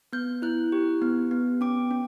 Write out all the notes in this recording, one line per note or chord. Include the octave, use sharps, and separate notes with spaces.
B3 G6
E4 F#6
G4
B3
B3
C#4 D6
C#4